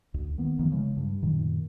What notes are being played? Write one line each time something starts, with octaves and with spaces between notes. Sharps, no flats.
D2
D#3 A#3 B3
F#1 D#3 F3 A3
C#3 G#3
G2
F#2 A#2 D#3